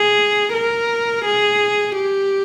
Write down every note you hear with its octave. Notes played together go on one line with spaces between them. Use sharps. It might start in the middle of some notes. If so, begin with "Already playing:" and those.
Already playing: G#4
A#4
G#4
G4